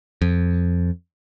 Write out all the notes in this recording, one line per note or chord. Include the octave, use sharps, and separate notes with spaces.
F2